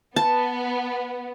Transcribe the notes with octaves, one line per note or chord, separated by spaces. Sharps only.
B3 A5